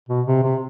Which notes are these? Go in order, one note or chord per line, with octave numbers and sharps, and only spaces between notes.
B2
C3
C3